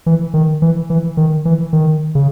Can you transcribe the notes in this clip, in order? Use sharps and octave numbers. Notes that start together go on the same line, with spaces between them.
E3
D#3
E3
E3
D#3
E3
D#3
C#3